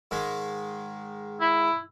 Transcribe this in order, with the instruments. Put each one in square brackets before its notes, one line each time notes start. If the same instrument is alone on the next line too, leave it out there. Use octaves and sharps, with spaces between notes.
[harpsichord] G#2 D#3 G#3
[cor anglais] E4